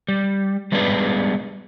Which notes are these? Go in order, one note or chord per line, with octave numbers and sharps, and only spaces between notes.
G3
G3 G#3 B3 D4 G#4 B4